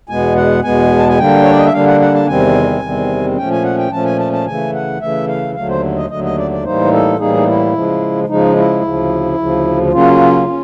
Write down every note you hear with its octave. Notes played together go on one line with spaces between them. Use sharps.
E2 B2 G#3 B3 G#5
F#5
E2 B2 G#3 B3 G#5
A5
G#5
D3 G3 A#3 D4 G5
C#5
D5
D#5
E5
D3 G3 A#3 D4 F5
F#5
F#5
A5
E2 C3 D#3 G3 C4 G#5
E2 C3 D#3 G3 C4
A#2 F3 A3 C#4 G5
G#5
F#5
G5
A#2 F3 A3 C#4 A5
G#5
A5
A5
C#3 E3 A3 G#5
F#5
C#3 E3 A3 E5
F5
D#2 D3 F#3 A3 F5
C5
D#5
D#2 D3 F#3 A3 D#5
D#5
D5
D5
A2 E3 G3 A#3 D#4 C5
A4
A2 E3 G3 A#3 D#4 G#4
D#4
E4
C#3 F3 G#3
C#3 F3 G#3 D#4
E4
D2 C#3 F3
D2 C#3 F3
C#3 F#3 A#3 C#4 F4
C#4